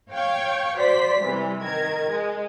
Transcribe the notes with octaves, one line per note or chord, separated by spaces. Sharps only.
C#5 F5 G5 C#6
F#3 C5 D5 B6
C3 E3 G3
D#3 A#4 G#6
G#3